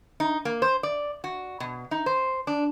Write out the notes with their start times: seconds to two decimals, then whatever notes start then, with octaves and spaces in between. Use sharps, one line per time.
0.20 D#4
0.45 A#3
0.62 C5
0.83 D5
1.24 F#4
1.60 B2
1.91 D#4
2.06 C5
2.47 D4